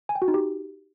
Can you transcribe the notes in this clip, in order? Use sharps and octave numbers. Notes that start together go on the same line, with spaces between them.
G#5
G5
F#4
D#4
G4